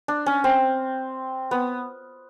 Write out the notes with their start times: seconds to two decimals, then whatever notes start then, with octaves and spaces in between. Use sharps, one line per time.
0.08 D4
0.26 C#4
0.44 C4
1.51 B3